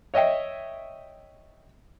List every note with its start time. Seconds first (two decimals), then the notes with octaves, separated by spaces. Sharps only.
0.14 C#5 D#5 E5 G5